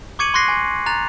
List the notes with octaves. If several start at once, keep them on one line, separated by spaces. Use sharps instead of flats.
C#6 D6 G#6 C#7 D#7 F#7
C6 C#6 F#6 A#6 C7
G#5
A#5 F#6 A6 F7